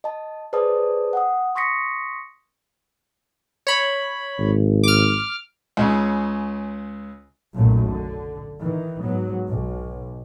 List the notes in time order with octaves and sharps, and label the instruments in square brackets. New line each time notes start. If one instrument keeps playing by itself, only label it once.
[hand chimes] D#5 A5
G#4 B4 C5 D5 A5 D#6
F#5 G5 D#6
C6 C#6 D#6 A#6 B6 C#7
[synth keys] C#5 B5
[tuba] G#1
[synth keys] D6 F6
[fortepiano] C#2 C#3 C#4
[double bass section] F#1 B1 F#2 A#2 A3
D3
D#3 E3
G#2 F#3 B3
B1